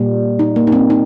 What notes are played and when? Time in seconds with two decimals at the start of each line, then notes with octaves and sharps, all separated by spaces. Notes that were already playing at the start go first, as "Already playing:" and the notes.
Already playing: A#2 G3 A#3
0.39 D#4
0.56 A#3
0.67 D#4
0.72 C4
0.90 D#4